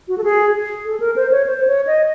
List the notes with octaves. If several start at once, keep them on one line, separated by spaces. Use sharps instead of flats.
F#4
A4
G#4
A4
A#4
C5
C#5
C5
C#5
D#5